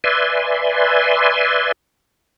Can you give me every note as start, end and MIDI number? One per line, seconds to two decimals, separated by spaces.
0.04 1.72 71
0.04 1.72 74
0.04 1.72 76
0.04 1.72 80
0.04 1.72 84